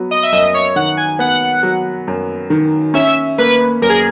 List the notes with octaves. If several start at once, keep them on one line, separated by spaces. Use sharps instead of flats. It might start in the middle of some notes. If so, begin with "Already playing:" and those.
Already playing: F#3 B3
D#5
E5
F#2 D#5
C#5
D#3 F#5
G#5
B3 F#5
F#3
F#2
D#3
C#4 E5
A#3 B4
F#2 A#4
G#4